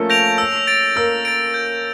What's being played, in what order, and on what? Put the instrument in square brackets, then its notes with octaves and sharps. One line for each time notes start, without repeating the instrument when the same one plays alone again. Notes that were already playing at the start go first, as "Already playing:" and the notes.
Already playing: [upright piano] F3 A3 A#3 C#4 F4 A4 A#4
[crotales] G6 A#6 D7 F7
E6
A6 D7
[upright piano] A#3 A#4 [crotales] E6
[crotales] A6 D7
G6